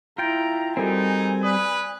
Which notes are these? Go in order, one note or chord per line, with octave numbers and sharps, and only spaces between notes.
E4 F4 G5 A#5 G6 A6 D7
G3 C4 D#4 F#4 A4 A#4 G#5
B4 D5 D#6